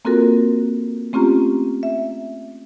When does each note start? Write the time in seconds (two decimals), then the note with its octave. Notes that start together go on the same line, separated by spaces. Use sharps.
0.05 A#3 C4 F4 F#4 A4 A#4
1.13 A3 C4 C#4 F4 G4 A#5
1.83 E5